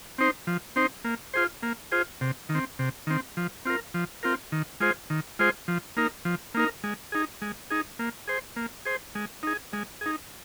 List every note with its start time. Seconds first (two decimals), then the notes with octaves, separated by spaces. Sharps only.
0.18 C4 D#4 C5
0.47 F3
0.76 C4 D#4 C5
1.04 A#3
1.34 F4 G#4 C5
1.63 A#3
1.92 F4 G#4 C5
2.21 C3
2.49 D#3
2.55 C4
2.79 C3
3.07 D#3 C4
3.37 F3
3.65 C4 F4 A#4
3.94 F3
4.23 C4 F4 A#4
4.52 D#3
4.80 G#3 F4 G#4 C5
5.10 D#3
5.39 G#3 F4 G#4 C5
5.68 F3
5.97 A#3 D#4 A#4
6.25 F3
6.54 A#3 D#4 A#4
6.84 G#3
7.12 D#4 G#4
7.42 G#3
7.70 D#4 G#4
7.99 A#3
8.28 G#4 C5
8.56 A#3
8.85 G#4 C5
9.15 G#3
9.43 D#4 G#4
9.73 G#3
10.01 D#4 G#4